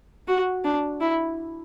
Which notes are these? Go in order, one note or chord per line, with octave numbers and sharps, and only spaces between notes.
F#4
D4
E4